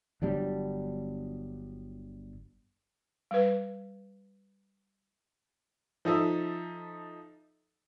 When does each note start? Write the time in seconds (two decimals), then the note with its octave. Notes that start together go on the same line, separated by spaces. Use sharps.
0.22 G1 F#3 G3 D4
3.31 G3 B4
6.05 F3 D#4 A4 E5